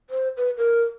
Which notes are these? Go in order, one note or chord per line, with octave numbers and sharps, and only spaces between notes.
C5
B4
A#4